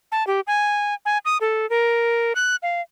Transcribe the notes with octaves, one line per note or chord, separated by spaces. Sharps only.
A5
G4
G#5
G#5
D#6
A4
A#4
F#6
F5